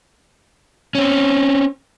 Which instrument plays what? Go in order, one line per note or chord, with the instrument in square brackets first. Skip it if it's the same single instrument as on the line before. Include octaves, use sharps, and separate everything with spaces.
[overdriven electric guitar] C4 C#4